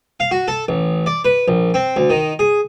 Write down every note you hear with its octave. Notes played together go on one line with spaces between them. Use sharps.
F5
F#4
A4
A1
D5
B4
A#1
C4
D2
D#3
G#4